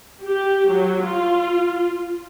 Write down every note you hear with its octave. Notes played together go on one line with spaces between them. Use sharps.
G4
F#3
F4